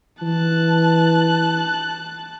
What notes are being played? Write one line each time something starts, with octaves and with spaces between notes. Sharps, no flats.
E3 A5 F#6